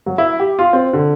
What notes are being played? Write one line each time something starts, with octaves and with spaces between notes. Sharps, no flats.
F#3
E4
G4
F4
C4
D3